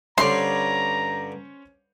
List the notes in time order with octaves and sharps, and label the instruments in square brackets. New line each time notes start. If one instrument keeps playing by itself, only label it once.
[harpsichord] G2 D3 [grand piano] C#4 C5 C#5 [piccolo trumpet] A#5 [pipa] C6